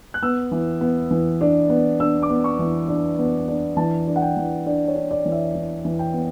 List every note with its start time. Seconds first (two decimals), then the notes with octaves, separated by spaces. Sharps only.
0.14 F#6
0.23 B3 E6
0.51 E3
0.81 B3
1.11 E3
1.41 D4
1.70 B3
2.00 D4 E6
2.22 D6
2.29 B3
2.44 C#6
2.59 E3
2.88 D4
3.19 B3
3.48 D4
3.77 E3 A5
4.07 D4
4.16 F#5
4.22 G5
4.37 E3
4.66 D4 D5
4.88 C#5
4.96 D4
5.11 D5
5.26 E3
5.32 E5
5.55 E3
5.85 E3
5.99 G5
6.13 B3